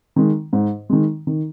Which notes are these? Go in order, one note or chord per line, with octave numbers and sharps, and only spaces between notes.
D#3 G#3
G#2
D#3 G#3
D#3